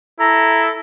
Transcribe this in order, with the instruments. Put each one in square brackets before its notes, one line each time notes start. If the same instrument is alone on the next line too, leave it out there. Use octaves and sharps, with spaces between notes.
[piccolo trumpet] E4 [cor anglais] A4 [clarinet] A#5